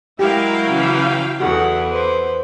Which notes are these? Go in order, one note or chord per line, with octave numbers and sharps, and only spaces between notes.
F#3 G#3 E4 G4 A#4 F5 G5
C#3 E3
E2 F#4 G#4 A4 F#5
B4 C5